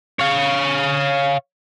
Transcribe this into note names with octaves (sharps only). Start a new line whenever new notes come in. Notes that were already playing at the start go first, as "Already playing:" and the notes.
C#5 F5